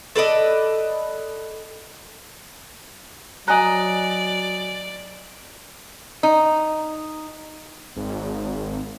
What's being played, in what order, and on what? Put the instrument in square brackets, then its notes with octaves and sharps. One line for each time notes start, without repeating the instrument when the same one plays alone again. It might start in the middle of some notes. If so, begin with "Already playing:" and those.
[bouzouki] A4 B4 D5 D#5
[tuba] F#3 [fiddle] D5 [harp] D#5 A#5 [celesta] G#5 F#6
[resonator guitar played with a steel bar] D#4
[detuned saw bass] G#1